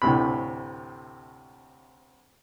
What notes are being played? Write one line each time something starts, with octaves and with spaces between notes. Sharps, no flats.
D2 A2 C3 B5